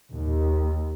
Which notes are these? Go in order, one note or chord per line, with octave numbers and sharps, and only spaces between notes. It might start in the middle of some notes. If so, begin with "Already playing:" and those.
D#2